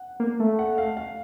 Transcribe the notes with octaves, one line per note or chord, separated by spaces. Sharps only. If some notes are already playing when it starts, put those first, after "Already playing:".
Already playing: F#5
A#3
A3
F#5
F5
F5